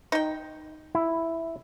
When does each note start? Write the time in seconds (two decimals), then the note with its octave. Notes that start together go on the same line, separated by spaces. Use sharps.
0.12 D#4 G5
0.95 E4